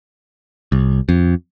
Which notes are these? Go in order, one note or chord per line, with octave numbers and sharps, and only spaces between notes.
C2
F2